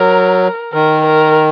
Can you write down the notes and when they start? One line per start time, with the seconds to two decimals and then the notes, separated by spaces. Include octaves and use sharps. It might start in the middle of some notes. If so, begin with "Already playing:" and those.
Already playing: F#3 A#4
0.73 D#3 A#4
1.06 A#4